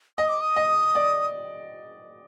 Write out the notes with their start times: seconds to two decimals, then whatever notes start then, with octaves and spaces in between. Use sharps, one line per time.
0.18 D#5 D#6
0.29 D6
0.41 D#6
0.56 D#5
0.95 D5